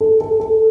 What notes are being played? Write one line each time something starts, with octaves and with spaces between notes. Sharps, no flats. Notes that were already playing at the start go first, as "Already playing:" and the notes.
A4
A4
A4